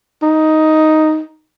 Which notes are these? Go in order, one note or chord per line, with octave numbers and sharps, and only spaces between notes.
D#4